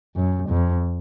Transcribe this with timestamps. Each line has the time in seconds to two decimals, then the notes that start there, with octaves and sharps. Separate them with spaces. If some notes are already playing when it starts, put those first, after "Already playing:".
0.16 F#2
0.50 F2